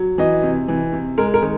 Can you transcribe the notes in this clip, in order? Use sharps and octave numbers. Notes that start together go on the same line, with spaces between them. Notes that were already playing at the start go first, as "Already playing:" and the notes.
Already playing: F#3
E3 D#5
C3
E3
C3
G#3 A#4
A#4
D#3